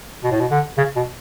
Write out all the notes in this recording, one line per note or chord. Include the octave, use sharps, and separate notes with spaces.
B2
A2
B2
D3
C#3
B2